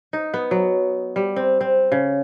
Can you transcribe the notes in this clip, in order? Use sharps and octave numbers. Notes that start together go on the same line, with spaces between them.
D#4
B3
F#3
G3
C4
C4
C#3